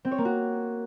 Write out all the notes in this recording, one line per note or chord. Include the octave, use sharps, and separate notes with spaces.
C4
C#5
A#3
F#4